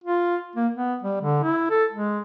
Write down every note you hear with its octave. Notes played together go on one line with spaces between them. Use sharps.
F4
A#3
B3
G3
D3
E4
A4
G#3